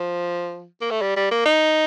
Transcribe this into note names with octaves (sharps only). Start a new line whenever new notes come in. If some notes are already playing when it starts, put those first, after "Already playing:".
Already playing: F3
A#3
A3
G3
G3
A#3
D#4